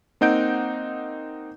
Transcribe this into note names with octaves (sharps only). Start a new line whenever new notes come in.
A#3 C4 D#4 F#5 G6 D7